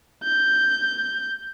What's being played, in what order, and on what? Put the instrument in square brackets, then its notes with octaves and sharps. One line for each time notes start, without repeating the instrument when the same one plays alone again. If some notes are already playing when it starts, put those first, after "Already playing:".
[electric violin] G6